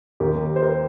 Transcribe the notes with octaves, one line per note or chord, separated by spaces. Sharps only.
D#2 D#3 G4 A#4
C5
G4 A#4